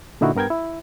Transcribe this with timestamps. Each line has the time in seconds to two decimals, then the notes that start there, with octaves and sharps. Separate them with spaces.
0.21 A#2 D3 D#4 E4 F#4
0.35 G2 B3 A#4 G5 G#6
0.50 E4